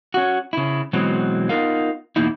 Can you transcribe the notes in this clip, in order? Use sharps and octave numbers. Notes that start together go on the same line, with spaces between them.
C#4 F#4
C#3 E4
B2 E3 F#3 G#3 B3 C4
B3 D#4 F4 A#4 F5
E2 B2 A#3 D#4 E4